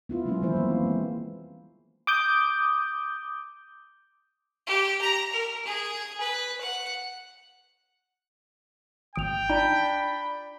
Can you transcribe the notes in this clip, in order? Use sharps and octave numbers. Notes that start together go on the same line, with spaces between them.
B3 E4 F4
F#3 G#3 A#3 B3 C#4 F4
D#3 E3 A#3 E4 C5
G3 A#3 B3
C4 E4
G#3
D6 D#6 G6
G4
A#5
A#4
G#4
B4
F#5
G#1 G5 D#6 D7 F7
D4 D#4 F4 D5 A#5 B5